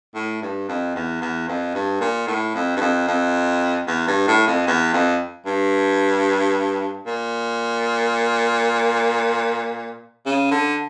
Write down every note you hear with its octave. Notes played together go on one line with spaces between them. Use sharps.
A2
G2
F2
E2
E2
F2
G2
A#2
A2
F2
G2
F2
F2
E2
G2
A2
F2
E2
F2
G2
A#2
C#3
D3